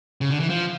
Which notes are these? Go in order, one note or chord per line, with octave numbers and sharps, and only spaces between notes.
C#3
D3
E3
F3